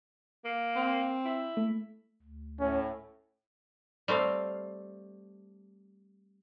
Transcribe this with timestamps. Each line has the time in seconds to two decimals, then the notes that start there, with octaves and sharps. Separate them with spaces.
0.45 A#3
0.76 C4
1.25 E4
1.57 A3
2.22 D2
2.60 A2 C#4
4.08 G3 A3 C4 F5